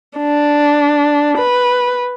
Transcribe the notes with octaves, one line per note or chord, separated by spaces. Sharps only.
D4
B4